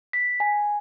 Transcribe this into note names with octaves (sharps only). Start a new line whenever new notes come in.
B6
G#5